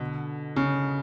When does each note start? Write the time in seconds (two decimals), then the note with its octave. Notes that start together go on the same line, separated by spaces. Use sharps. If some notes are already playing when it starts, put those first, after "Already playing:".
Already playing: B2 D3
0.56 C#3